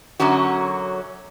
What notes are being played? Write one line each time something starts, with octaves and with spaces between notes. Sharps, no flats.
F#2 D3 F#3 C#4 F#4